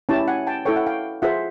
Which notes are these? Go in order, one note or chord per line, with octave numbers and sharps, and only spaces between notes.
C#4 E4 G4 G5 A5
F#5 G#5
G5 A5
E4 A4 C#5 G5
F#5
F5 G5
F4 G#4 C5 E5 F#5